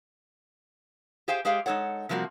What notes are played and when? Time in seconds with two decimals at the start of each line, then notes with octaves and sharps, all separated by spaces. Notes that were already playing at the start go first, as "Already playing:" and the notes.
1.28 G4 G#4 C5 F5 G5 G#5
1.45 G#3 G4 G#4 C5 F5 G5
1.66 G#3 D#4 A4 C#5 F#5
2.09 C3 F3 G3 A#3 F#4